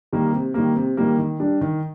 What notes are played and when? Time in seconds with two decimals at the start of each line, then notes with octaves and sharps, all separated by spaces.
0.13 D#3 G3 A#3
0.33 C3
0.54 D#3 G3 A#3
0.76 C3
0.97 D#3 G3 A#3
1.18 D#3
1.40 G3 D4
1.61 D#3